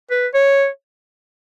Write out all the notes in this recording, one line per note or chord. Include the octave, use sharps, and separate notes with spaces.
B4
C#5